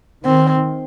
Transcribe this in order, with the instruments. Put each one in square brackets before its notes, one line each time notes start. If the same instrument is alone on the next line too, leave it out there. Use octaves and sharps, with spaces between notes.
[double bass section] D#3 [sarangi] C4